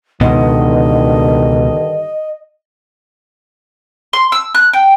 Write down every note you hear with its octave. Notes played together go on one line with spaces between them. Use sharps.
C#2 G2 B2 D3 D#3 D#5
C6
E6
F#6
G5